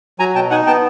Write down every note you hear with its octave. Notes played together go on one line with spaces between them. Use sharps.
F#3 G#5 A#5
B2 G5 A5
D#4 F#5 G#5
B3 G5 A5